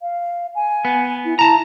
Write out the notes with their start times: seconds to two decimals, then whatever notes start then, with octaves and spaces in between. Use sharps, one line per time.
0.02 F5
0.55 G#5
0.85 B3
1.25 E4
1.39 E4 A5 A#5